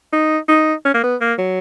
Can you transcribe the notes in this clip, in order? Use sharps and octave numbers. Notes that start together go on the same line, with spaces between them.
D#4
D#4
C#4
A#3
B3
A#3
F#3